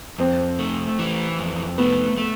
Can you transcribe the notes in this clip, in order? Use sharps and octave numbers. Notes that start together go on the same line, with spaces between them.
F2 C4
A3
E3
F2
A3 B3
A3